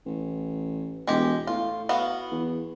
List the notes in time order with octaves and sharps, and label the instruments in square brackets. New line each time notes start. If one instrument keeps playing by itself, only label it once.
[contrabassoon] A1
[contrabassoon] E1 [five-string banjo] G#3 G4
[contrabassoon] A2 [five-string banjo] F4
[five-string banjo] B3 F#4 F5
[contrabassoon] E2